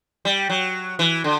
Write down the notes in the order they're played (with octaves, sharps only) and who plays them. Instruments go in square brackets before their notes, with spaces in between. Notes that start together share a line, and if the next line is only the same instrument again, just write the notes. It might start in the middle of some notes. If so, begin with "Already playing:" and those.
[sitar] G3
F#3
E3
D3